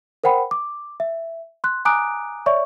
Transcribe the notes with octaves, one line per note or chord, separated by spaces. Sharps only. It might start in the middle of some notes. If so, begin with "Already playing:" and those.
A#4 C5 F#5 G5 B5
D6
E5
C6 F#6
G#5 A#5 D6 D#6 F#6 D7
C#5 D5 E5 C#6